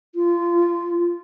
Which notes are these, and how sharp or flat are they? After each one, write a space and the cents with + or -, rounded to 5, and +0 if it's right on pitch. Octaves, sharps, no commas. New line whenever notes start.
F4 -20